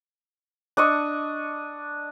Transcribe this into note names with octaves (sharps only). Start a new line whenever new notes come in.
D4 D#5 C#6